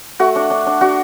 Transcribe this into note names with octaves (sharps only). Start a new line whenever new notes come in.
A3 F#4
D4
D4
D4
D4 F#4